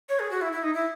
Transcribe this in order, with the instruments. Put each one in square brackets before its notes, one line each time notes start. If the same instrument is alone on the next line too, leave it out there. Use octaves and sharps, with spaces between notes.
[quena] C#5
G#4
F#4
E4
E4
D#4
E4